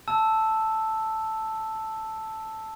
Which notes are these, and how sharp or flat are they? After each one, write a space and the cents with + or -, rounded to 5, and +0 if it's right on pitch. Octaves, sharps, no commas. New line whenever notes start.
A5 +0 E6 +0